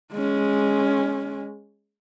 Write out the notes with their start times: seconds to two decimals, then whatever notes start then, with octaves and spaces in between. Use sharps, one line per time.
0.13 G#3 C#4